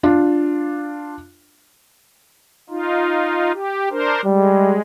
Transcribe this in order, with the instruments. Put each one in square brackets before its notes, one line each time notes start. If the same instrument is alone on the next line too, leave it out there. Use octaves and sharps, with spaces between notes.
[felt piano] D4 F4
[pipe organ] D#4 F4
G4
D4 A#4 C5
[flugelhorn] G3 [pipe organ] G#3